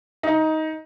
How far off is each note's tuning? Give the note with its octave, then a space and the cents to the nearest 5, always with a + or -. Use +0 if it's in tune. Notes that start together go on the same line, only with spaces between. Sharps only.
D#4 +15